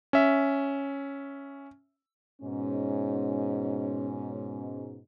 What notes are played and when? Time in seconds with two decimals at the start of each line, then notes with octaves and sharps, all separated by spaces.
0.13 C#4 E5
2.42 G#2 B2 C#4